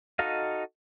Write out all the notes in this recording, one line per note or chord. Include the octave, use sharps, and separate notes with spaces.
D#4 F#4 A4 D#5 F5